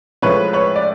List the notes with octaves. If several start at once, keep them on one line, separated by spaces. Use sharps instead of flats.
A2 F3 G#3 B4 C#5
B4 C#5
D5